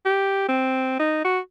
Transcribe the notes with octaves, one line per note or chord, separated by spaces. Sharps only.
G4
C4
D#4
F#4